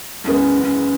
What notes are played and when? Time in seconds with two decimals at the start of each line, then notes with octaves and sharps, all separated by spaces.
0.24 F#1 E2 D#3 G#3 B3 C#4
0.63 C#4